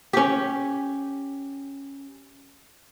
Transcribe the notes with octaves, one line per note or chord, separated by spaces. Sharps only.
C#4 G4